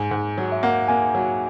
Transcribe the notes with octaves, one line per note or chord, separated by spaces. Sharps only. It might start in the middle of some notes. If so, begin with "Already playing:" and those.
Already playing: G#2 G#5
G#2
F#3
E5
A#3 F#5
A#3 G#5
F#3